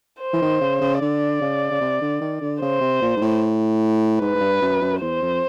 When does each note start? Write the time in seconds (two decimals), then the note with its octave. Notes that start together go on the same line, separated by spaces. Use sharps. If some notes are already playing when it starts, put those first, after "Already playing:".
0.21 C5
0.33 E3
0.42 D#3
0.61 C#3
0.81 C#3
1.01 D3 D5
1.41 C#3
1.71 C#3
1.81 C3
2.01 D3
2.21 D#3
2.41 D3
2.61 C#3 C5
2.81 C3
3.02 A#2
3.16 G#2
3.21 A2
4.21 G#2 B4
4.35 G#2
4.41 G2
4.62 F#2
4.82 F#2
5.01 E2 C5
5.22 F2